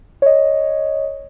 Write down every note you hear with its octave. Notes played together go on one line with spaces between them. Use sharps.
C#5 D#5